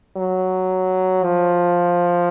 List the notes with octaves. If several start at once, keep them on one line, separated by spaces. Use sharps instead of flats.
F#3
F3